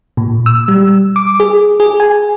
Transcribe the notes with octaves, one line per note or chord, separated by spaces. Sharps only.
A#2
E6
G3
D6
G#4
G#4
G#5